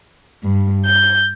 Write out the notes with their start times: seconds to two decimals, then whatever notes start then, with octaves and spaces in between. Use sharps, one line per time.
0.43 G2
0.85 G6